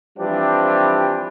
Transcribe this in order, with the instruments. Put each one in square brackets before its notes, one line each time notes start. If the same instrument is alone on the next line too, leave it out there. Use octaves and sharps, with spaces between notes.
[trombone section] E3 F3 G3 C4 D4 G4